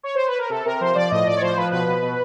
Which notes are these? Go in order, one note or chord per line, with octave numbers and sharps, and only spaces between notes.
C#5
C5
B4
A#4
C3 A4
C3 A#4
F3 C5
F3 D5
A2 D#5
A2 D5
C#5
F3 C5
F3 B4
B2 B4
B2
B2